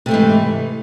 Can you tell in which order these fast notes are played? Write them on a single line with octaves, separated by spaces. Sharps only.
C3 A3 G#2 E3